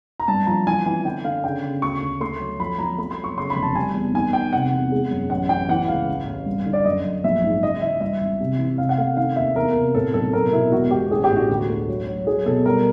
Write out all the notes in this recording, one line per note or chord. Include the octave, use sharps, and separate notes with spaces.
A#5
G2 A5
F3 A#5
E3 G#5
E3 G#5
D3 G5
D3 F5
C#3 G5
C#3
D2 C#6
D2
A3 C6
F#3
F3 B5
F3 A#5
A3 B5
C6
F#3
C#6
C#3 C6
B5
F1
A5
G3 G#5
E2
D#3 G#5
D#3 G5
C3 F#5
E2
G#3
F#2
A1 F#5
A1 G5
E3 F#5
C#2 F5
A1
A1
G2
D3
D5
F#2 D#5
F#2
A#1 E5
G#2
C#3 D#5
E3 E5
G2 E5
G#1
C3
E3
C3 F5
F#5
A3 F5
D#3 F5
D#2 E5
E2 A#4
C3
A2 A4
B1 A4
B2 A#4
B2 E4
E1 F#4
E1 G4
A1 G#4
G4
A2
F#4
D2
A3
F#3
F#3
F#3 G#4
B2 A4
G3 A#4